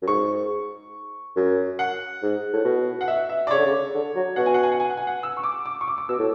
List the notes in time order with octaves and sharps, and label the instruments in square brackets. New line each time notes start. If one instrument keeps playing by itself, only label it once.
[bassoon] F#2
[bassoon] G#2 [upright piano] C#6
[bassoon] F#2
[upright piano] F#5
[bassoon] G#2
A2
B2
[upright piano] F#5
E5
E5
D5
[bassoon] C#3 [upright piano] C#5
[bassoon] D3
C#3
D3
F#3
[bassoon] B2 [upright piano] F#5
[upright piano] G#5
F#5
G#5
F#5
G#5
F#5
G#5
F#5
E6
C#6
D6
D6
C#6
D6
D6
[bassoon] B2 [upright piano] E6
[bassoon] A2